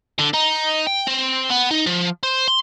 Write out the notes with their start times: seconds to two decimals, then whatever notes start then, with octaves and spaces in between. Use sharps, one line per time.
0.18 D3
0.33 D#4
0.87 G5
1.07 C4
1.50 B3
1.71 D#4
1.86 F3
2.23 C5
2.48 C6